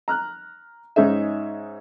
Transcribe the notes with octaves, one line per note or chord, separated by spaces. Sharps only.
A#5 F6 F#6
G#2 C#4 D#4 G#4 E5